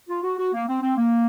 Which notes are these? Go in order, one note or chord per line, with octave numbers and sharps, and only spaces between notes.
F4
F#4
F#4
A#3
C4
C4
A#3